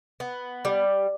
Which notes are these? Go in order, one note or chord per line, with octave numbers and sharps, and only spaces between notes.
B3
G3